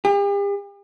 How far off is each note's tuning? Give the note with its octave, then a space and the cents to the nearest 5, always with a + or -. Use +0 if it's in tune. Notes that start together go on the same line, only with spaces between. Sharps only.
G4 +45